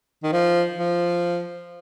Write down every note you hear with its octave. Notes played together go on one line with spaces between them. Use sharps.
D#3
F3
F3